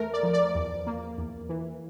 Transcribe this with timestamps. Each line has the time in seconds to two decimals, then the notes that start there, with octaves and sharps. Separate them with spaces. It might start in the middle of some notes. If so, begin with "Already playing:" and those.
Already playing: E2 A3 A#4
0.14 D5
0.23 F3
0.33 D5
0.55 E2
0.87 A#3
1.18 E2
1.49 E3